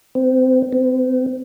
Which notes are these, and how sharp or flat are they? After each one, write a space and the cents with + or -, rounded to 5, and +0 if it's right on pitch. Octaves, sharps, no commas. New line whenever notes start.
C4 -25
C4 -35